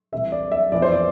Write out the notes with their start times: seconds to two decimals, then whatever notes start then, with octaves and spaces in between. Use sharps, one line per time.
0.12 C2 C3 E3 E5
0.32 D5
0.52 E5
0.72 F2 E3 B3 D5
0.82 C5
0.92 D5